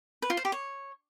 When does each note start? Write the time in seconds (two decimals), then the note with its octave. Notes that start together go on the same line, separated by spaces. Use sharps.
0.22 B4
0.30 F4
0.37 C5
0.45 G4
0.52 C#5